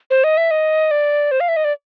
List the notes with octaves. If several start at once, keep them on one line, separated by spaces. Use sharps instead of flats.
C5
D#5
E5
D#5
D5
C5
F5
E5
D#5
D5